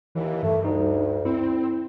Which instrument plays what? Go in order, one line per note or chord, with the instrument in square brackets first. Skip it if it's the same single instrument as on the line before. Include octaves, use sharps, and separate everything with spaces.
[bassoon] D#2 [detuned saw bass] E3
[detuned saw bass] G2 [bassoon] A3
[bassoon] D2 [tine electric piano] D#4
[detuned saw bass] C4 [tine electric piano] E4